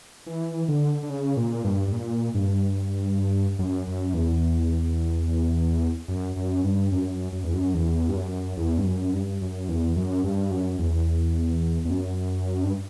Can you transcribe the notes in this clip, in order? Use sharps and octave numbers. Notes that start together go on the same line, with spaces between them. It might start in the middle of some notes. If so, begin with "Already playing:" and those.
E3
D3
D3
C#3
A#2
G2
G2
A#2
G2
F#2
F#2
E2
F#2
F#2
G2
F#2
F#2
E2
F#2
E2
G2
F#2
E2
G2
F#2
G2
F#2
E2
F#2
G2
F#2
E2
E2
F#2
G2